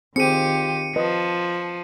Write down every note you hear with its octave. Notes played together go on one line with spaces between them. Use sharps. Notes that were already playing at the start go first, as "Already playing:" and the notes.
D#3 C4 F4 G4 G#4 C#7 D#7
F3 B4 D#5 A5